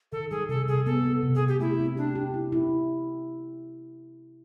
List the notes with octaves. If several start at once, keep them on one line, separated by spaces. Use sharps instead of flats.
D#3 A4
G3 G#4
C3 A4
C3 G#4
B3 A4
B3
C3
G#4
C3
G4
A3 E4
C4
D4 G4
G4
E4
E4